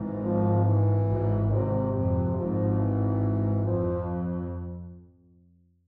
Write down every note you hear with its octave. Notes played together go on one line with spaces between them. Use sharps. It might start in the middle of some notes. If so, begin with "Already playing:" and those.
Already playing: G#1 G#2 E3
F3
E3
G#1 G#2
G#1 G#2 C3
F2 C3
G#1 G#2 F3
E3
F2 F3